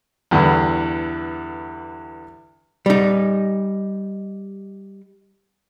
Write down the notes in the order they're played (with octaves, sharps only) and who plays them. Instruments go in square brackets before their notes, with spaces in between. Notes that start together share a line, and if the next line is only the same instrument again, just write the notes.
[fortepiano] E2 G2 D3 E3
[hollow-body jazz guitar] G3 D#4